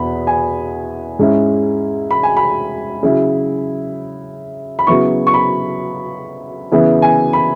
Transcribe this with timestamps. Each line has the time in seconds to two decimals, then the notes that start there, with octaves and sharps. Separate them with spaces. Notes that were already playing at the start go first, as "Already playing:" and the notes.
Already playing: E2 B2 B3 E4 B5
0.27 G#5
1.19 G#2 G#3 C#4 E4
2.11 B5
2.23 G#5
2.37 B5
3.03 C#3 F#3 E4
4.79 B5
4.87 C#3 F#3 B3 E4 C#6
5.27 C#6
5.34 B5
6.71 C#3 E3 B3 E4
7.02 G#5
7.33 B5